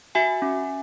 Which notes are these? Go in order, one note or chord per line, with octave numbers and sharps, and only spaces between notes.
F#4 E5 G#5
C#4